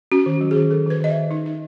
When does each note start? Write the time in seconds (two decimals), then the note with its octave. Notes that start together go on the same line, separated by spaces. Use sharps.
0.12 C#4 F#4
0.26 D#3
0.41 F#3
0.51 D#3 G#4
0.70 D#3 A4
0.86 D#3 B4
1.00 D#3 D#5
1.10 E5
1.15 D#3
1.31 D#4
1.46 D#4